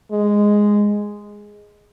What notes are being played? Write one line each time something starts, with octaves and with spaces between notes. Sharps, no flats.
G#3